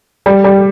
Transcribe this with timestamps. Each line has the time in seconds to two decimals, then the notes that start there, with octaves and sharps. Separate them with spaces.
0.26 G3
0.44 G3